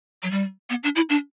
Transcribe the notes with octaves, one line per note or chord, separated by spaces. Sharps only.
F#3
G3
B3
D4
E4
D4